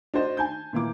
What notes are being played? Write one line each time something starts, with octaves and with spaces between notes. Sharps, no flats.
D4 F#4 C5 D#5
G#5 A5 G6
A#2 E3 A#3 D6